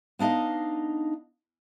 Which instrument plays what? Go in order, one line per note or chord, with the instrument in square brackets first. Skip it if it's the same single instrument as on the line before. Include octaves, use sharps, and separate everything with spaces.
[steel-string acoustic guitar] B3 D4 D#4 D#5 F5